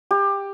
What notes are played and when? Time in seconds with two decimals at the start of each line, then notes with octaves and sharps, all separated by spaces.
0.11 G4